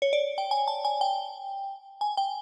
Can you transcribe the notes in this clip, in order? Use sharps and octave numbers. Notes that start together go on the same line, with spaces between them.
C#5
D5
G5
G#5
A5
G#5
G5
G#5
G5